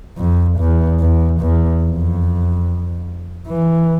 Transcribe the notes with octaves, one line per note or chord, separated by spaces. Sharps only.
F2
E2
E2
E2
F2
E3